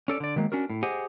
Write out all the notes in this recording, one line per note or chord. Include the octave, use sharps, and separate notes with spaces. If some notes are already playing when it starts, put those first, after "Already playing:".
C#4 A4 D5
D3 D5
D#3 F#3 G#3 A#3
C#4 D4 F#4 A#4
A2
G4 G#4 C5 D#5 F#5 G#5